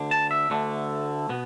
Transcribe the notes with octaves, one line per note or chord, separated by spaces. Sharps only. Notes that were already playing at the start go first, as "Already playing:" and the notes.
Already playing: D2 D3 D4
A5
E5
D2 D3 A3
B2 B3